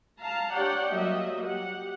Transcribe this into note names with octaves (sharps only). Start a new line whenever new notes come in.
F5 A5 A#5
D4 G4 C#5 D5 F#5 G5
F#3 G3 A#3 D#5 E5
G4 F#5